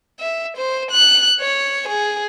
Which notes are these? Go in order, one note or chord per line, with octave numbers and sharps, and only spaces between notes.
E5
C5
F#6
C#5
G#4